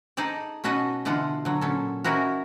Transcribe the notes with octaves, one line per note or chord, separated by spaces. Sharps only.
D#4 G#4 A4 D5
B2 C#4 F#4 A4 B4 D#5
B2 D3 E3 F4 F#5
D3 F#3
A#2 C#4 A4
E3 C#4 D#4 E4 F#4 A#4